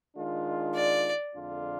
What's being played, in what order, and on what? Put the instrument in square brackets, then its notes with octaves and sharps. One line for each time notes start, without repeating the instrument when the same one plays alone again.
[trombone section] D#3 G#3 D4 F4
[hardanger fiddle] D5
[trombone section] F2 D3 G#3 D4 F4